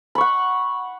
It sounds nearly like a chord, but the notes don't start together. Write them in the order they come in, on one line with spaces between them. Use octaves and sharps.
B5 C#6 F#5